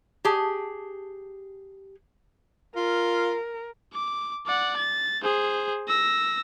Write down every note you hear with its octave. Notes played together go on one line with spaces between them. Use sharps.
G4 G#4 A5
F4 A#4
D6
D5 F#5
A6
G#4 C5
E6 A#6